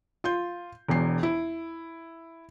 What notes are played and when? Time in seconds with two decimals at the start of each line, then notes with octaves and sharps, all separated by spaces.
0.24 F4 C6 G6
0.89 E1 E2 C7
1.23 E4